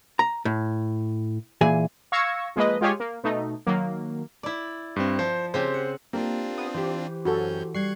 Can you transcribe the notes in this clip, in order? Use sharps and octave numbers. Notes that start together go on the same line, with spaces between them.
A#5
A2
A#2 E3 G#4 G#5
F5 C#6 E6 G#6 A#6 C#7
F3 G#3 A#3 B4 D#5
G#3 F4 G4 G#4 C#5 G#5
A#3
B2 A3 D#4
D#3 F#3 A#3
E4 D5
G2 C4
F3 C5
C#3 C4 G4 C5
F#5
A#3 C4 D4 F4 G4 A#4
B3 D#6
E3 G4 C5
F#2 C#4 F#4 A4 G6
G3 C#6 F#6 G#6 C7